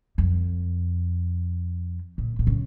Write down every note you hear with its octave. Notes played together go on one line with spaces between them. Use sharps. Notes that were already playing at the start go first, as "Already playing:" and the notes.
F2
A#2
A#2
C#3